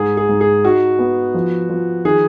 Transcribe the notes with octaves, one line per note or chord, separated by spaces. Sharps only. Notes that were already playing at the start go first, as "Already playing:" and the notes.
Already playing: G#2 G#4
G#4
G#2
G#4
D#4 F#4
B3
F3
F3
D#3 G#4